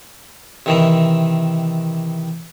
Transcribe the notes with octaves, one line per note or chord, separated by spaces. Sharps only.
C3 D#3 E3